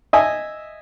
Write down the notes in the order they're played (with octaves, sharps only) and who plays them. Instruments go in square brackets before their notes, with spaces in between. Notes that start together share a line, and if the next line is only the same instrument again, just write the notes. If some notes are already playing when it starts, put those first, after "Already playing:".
[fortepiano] D#5 E5 G#5